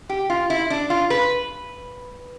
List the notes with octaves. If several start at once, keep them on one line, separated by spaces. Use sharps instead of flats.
G4
F4
E4
D4
F4
B4